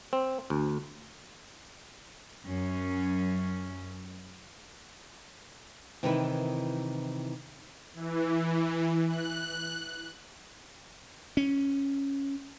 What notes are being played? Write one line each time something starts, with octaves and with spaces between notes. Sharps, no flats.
C4
D2
F#2 C#4
C3 D#3 E3 D#4 E4 B4
E3
F#6
C#4